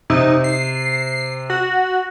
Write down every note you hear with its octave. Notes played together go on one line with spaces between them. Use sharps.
C3 D#4
C7
F#4